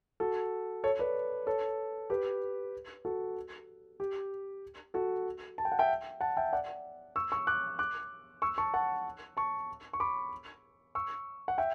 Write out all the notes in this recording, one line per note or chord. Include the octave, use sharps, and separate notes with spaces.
F#4 A4
A4 C#5
B4 D5
A4 C#5
G4 B4
F#4 A4
G4
F#4 A4
A5
G5
F#5
E5 G5
F#5 A5
E5 G5
D5 F#5
C#6 E6
C#6 E6
D6 F#6
D6 F#6
C#6 E6
A5 C#6
F#5 A5
A5 C#6
C#6
B5 D6
C#6 E6
F#5
E5 G5